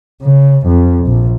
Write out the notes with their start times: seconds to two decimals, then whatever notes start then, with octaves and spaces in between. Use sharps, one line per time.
0.22 C#3
0.67 F2
1.07 A#1